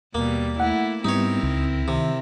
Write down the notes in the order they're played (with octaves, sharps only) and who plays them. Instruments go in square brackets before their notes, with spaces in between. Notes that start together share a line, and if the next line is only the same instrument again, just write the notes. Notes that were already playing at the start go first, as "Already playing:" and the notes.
[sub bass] D#2 [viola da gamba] B2 G3 [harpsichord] A#3
[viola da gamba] A3 E4 [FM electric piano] F#5
[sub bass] G#2 [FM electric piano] G3 B3 [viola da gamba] C4 E4 A#4 [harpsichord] D#4 C#5
[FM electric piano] C#2 [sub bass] C#3
[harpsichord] C3 [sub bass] D#3